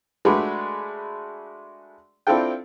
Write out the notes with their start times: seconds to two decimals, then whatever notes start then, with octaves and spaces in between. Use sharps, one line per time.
0.25 G#3 A3 D4 F#4 B4 D5
2.27 C4 D4 E4 F4 A4 G5